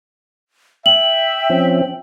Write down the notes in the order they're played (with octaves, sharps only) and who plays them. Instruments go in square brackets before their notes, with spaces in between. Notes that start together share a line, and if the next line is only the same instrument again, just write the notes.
[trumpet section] E5 [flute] G5 [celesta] F#7
[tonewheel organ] F3 C4 C#4